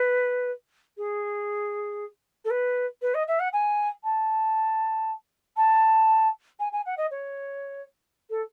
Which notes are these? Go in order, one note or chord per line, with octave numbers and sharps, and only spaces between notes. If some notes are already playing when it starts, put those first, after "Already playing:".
Already playing: B4
G#4
A4
B4
B4
D#5
E5
F#5
G#5
A5
A5
G#5
G#5
F#5
D#5
C#5
A4